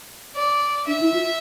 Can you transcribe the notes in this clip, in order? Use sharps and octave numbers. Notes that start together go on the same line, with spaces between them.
D5
D4 E5
E4
F4